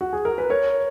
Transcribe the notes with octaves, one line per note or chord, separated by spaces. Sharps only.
F#4
G#4
A#4
B4
A#4 C#5